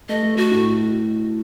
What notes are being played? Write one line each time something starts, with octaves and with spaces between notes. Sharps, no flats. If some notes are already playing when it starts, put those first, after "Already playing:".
A3 D#5
A3
A3 F#4
A2